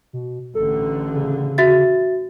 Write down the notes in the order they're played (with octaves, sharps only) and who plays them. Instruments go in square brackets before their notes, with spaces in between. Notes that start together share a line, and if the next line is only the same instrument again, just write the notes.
[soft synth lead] B2
[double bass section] A1 D3 [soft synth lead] A4
[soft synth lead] C#3
[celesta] F#4 E5 A6